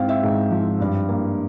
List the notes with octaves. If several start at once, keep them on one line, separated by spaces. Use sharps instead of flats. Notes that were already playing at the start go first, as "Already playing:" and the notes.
Already playing: G#2 C4 F5 G5
E5
G#2
F3
G2
A#3